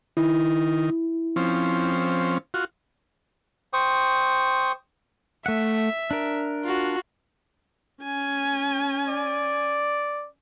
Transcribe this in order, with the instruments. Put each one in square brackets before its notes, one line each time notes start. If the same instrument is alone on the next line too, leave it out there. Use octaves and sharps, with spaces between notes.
[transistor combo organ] D#3 [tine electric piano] E4
[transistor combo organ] F3 C4 C#4
F4 F#4
[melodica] C5 G5 C#6 D#6
[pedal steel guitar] A3 F#5 [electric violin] E5
[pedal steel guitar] D4 A#4
[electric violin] F4 F#4
[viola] C#4 G#5
[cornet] D5